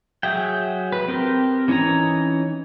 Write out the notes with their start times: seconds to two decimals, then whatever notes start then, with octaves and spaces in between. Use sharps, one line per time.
0.23 F#3 G#4 E5 G5
0.92 B4
1.08 C4 G4 A#4
1.68 E3 C#4 D#4 C#5 A#5